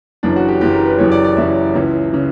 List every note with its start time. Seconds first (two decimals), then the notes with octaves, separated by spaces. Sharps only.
0.23 F#1 F#2 E3 D4
0.36 F#4
0.48 G4
0.61 F#1 F#2 E3 G4
0.74 A#4
0.86 B4
0.98 F#1 F#2 E3 C#5
1.12 D5
1.24 D5
1.37 F#1 F#2 E3 E5
1.74 C#2 C#3 E3
2.12 C#3 E3